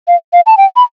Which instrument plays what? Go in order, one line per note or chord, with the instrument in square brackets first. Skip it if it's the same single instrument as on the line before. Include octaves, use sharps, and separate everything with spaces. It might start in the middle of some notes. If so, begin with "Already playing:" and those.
[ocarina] F5
F5
A5
G5
B5